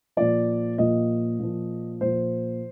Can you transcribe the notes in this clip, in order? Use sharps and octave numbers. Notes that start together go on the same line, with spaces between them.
A#2 F3 D5
A#2 F3 D#5
A#2 F3
A#2 F3 C5